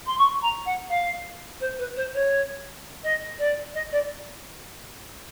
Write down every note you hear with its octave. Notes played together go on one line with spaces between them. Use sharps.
C6
C#6
A#5
F#5
F5
C5
B4
C5
C#5
D#5
D5
D#5
D5